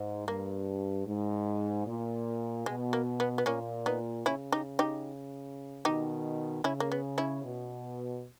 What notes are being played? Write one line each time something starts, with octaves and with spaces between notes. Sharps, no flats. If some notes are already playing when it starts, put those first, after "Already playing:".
Already playing: G#2
G2 A#3
G#2
A#2
B2 G#3
A#3
B3
B3
A#2 A#3 C#4
B3 D#4
C#3 C#4 E4
D#4 G4
D#4 G4
B2 D#3 D#4 G4
C#3 C#4 E4
A#3
B3
C#4 E4
B2